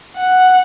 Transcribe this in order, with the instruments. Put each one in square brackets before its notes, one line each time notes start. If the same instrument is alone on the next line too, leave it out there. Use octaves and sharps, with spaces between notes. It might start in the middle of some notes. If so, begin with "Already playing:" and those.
[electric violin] F#5